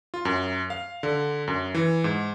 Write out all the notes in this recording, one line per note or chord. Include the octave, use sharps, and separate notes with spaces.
F4
F#2
F5
D3
F#2
E3
G#2